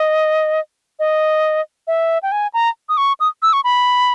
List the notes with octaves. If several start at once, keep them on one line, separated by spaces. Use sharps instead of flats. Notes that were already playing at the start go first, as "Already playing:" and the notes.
Already playing: D#5
D#5
E5
G5
G#5
A#5
D#6
C#6
D#6
E6
C#6
B5